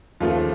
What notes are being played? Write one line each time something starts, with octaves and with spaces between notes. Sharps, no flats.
D#2 C#3 F3 A3 F4